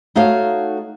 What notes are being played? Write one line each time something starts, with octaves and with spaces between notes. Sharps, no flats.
A3 D#4 F#4 A4 C#5 F5